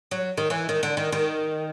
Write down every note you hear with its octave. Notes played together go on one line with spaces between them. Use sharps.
F#3
D#3
E3
D#3
D3
D#3
D#3